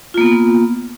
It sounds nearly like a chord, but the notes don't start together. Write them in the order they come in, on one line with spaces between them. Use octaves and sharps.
F4 A#3 B3